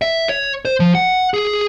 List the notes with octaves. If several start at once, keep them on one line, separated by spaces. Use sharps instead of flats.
E5
C#5
C5
F3
F#5
G#4